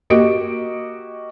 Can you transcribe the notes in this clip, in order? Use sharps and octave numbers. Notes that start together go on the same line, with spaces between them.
A#3 F#4 G4 D#5 D7